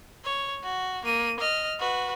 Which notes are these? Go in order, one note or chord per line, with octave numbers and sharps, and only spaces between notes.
C#5
F#4
A#3 D#7
D#5 F6
F#4 B4